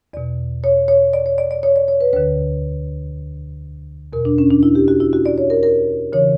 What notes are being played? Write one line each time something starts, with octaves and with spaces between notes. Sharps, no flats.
E2 B2 D5
C#5
C#5
D5
C#5
D5
D5
C#5
D5
C#5
B4
D2 D3 B4
E2 B2 A#4
D4
C#4
D4
E4
G4
F#4
E4
F#4
D5
C#5
A#4
A#4
C#3 E3 C#5